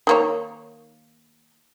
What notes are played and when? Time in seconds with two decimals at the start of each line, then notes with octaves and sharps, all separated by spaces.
0.07 D#3 A#3 C#5